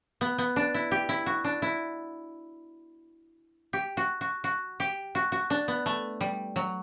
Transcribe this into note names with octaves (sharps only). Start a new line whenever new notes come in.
B3
B3
D4
E4
G4
E4
F#4
D4
E4
G4
F#4
F#4
F#4
G4
F#4
F#4
D4
B3
A3
G3
F#3